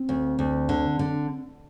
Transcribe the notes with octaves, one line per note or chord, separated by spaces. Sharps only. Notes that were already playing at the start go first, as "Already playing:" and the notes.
Already playing: C4
D2
D2
D3
D3